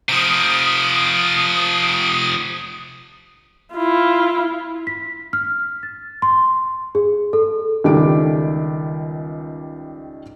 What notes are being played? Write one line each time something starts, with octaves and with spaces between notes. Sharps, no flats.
C3 F3 D#6 D7
E4 F4
B6
F6
A6
C6
G#4
A4
C#2 D#3 G3 A3 D6 D7